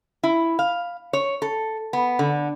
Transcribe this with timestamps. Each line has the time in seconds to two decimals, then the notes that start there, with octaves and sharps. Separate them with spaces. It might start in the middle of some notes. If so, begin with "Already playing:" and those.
0.23 E4
0.59 F5
1.13 C#5
1.42 A4
1.93 B3
2.19 D3